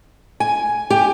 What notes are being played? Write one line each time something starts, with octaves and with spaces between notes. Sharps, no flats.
G#5
G4